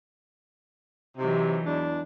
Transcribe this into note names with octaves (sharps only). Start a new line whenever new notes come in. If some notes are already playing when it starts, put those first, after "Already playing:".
C3 E3 F#3 D#4
E2 G#3 D4